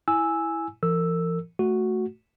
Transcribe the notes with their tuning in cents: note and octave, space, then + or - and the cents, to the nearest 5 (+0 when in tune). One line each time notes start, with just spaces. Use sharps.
E4 +0 G#5 +0 E6 -5
E3 +45 A#4 -40 E6 +0
A3 +0 F#4 +0